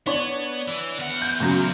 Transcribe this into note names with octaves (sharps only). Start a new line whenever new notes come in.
B3 D4 C#5
E3
E2 F#5
G6
A#2 C#3 F#3